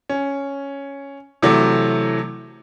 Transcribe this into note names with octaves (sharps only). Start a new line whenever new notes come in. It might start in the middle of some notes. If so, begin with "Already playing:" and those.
C#4
C3 E3 F#3 A3